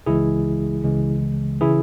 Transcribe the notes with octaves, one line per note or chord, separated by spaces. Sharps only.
C#2 C#3 E3 G#3 E4 G#4
C#2 C#3 E3 G#3
C#3 E3 E4 G#4